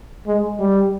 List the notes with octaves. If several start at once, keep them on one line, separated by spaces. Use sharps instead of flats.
G#3
G3